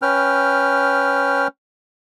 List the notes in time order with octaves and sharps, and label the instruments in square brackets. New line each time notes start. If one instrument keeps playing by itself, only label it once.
[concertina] C#4 B4 G5 F6